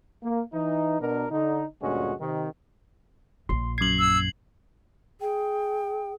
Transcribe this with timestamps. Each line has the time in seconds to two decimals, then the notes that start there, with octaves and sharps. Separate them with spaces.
0.23 A#3
0.53 E3 D#4
1.00 B2 D4 A#4
1.31 D3 D#4
1.81 D2 G2 A#2 G#3 C#4 F#4
2.19 C3 D#3
3.49 A#1 A#2 C6
3.78 F#2 G#6 C7 F#7
3.99 E6
5.21 G#4 G5